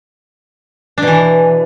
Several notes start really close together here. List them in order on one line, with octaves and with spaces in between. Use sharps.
D4 B2 E3